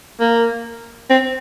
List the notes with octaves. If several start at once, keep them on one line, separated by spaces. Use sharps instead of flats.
A#3
C4